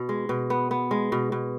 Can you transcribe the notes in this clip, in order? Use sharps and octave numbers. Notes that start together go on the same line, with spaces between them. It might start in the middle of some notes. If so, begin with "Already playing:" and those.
Already playing: B2
G#3
B2
B3
B3
G#3
B2
B2